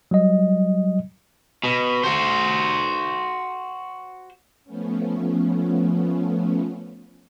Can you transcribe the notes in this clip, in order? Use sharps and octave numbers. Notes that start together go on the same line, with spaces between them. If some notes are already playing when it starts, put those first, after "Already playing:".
F#3 G3 D#5
B2
F#4 C5
F3 A3 B3 C#4